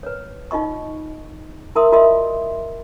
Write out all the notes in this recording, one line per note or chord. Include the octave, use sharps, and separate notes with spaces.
B4 C#5
D#4 F4 D#5 C#6
E4 A#4 E5 C6 D#6
F4 F#4 A#4 D#5 E5 C6